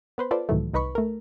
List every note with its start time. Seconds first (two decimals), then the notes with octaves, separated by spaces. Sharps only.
0.18 B3 B4 C5
0.31 F4 A4 B4 C5 D5
0.49 C#2 A2 D#3 E3 F#3 A3
0.74 C2 D#4 B4 B5 C#6
0.95 A3 A#4